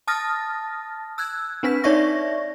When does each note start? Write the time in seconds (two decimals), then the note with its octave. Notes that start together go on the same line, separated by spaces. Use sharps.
0.08 A5 D#6 F6 A6 A#6
1.18 E6 F#6 G#6
1.63 C4 D4 B4 B6
1.84 D#4 C#5 D5 E5 C#6 A#6